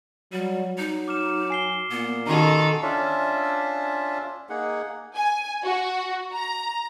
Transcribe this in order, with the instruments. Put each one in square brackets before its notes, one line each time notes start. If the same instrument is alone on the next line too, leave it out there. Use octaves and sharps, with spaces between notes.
[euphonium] F#3 [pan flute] G3
[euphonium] F#3 [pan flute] D#4
[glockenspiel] D6 F6 E7
G#5 C7 G7
[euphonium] A#2 [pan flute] B3
[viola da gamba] D#3 F#4 A4 [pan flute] C#4 [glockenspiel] A#5 C6 F7
[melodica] C#4 D4 F4 E5
A#3 D#4 G#4 F#5
[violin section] G#5
F#4
A#5